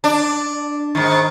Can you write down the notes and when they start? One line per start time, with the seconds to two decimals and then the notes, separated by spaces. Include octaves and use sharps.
0.04 D4
0.95 G#2 D#3